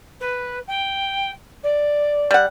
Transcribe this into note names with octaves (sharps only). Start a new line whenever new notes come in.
B4
G5
D5
G3 F#5